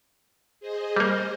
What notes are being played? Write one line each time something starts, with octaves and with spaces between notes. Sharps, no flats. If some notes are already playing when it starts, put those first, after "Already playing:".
G#4 C5 D#5
G3 A#3